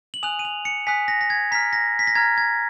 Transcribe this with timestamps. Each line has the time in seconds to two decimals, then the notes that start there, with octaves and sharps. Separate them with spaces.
0.14 F#7
0.23 G#5 D#6 F#6 F7
0.39 D#7
0.45 F7
0.65 C#7
0.87 G#5 D#6 F#6 B6
1.08 A#6
1.21 A#6
1.30 G#6
1.51 A#5 B6
1.55 F6
1.73 A#6
1.99 B6
2.07 A#6
2.15 A#5 F6 G#6
2.38 G#6